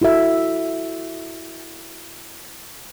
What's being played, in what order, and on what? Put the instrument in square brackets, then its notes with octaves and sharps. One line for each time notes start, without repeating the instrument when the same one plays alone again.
[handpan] E4 F#4 A4 E5